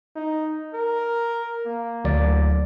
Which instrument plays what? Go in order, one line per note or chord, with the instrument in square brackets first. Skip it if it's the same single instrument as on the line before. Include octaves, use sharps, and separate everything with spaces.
[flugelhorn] D#4
A#4
A#3
[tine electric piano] D2 F#3 D5